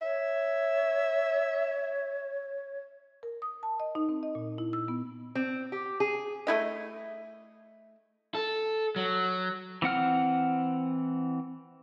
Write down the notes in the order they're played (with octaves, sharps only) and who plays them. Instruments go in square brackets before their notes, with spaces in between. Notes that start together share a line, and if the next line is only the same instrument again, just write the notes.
[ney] C#5 [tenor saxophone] E5
[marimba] A#4
D#6
A5
D#5
D#4
C4
D#5
A#2
E4
E6
B3
[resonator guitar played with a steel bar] C4
G4
G#4
[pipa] A3 E4 D#5
[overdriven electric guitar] A4
F#3
[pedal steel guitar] E3 C4 F#5 F6